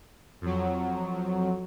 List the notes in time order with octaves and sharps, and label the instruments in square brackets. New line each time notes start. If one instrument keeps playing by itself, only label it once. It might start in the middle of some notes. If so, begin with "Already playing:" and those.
[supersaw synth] F2 F#3